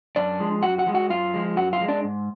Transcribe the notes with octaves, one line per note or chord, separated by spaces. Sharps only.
F#2 D4 D5
F3 G#3
F#2 F#4 F#5
F#4 F#5
F3 G#3
F#4 F#5
F#2 F4 F5
F3 G#3
F#2 F#4 F#5
F4 F5
F3 G#3
D4 D5
G#2